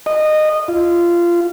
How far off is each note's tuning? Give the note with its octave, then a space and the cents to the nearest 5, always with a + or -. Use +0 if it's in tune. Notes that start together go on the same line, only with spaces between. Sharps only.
D#5 -20
F4 -20